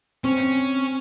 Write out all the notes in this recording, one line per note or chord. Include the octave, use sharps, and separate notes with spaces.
C4 C#4